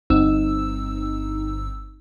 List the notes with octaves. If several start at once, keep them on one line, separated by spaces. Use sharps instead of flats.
G1 G2 C4 D#4 E6